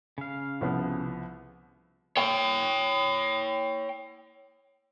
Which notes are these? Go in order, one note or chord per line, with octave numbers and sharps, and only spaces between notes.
C#3 F5
C2 F3 B3
C#5 G5